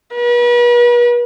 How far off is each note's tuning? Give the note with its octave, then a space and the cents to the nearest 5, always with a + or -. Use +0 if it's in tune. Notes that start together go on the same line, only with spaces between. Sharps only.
B4 -40